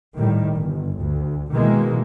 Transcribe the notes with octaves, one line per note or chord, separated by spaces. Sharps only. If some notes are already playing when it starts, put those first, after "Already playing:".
A2 D#3 G3
G1
D2
B2 D#3 E3 G#3 A#3